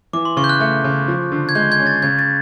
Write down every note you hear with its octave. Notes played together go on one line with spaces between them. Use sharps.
E3 D6
C6
C#3 C#6
G6
F#6
A3
C#3
F3
D3
G#6
G#3 G6
G#6
C#4
A6
C#3 G#6
A6